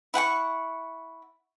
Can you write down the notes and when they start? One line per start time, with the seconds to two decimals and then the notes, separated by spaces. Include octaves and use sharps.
0.14 E4 F#5 G5 C#6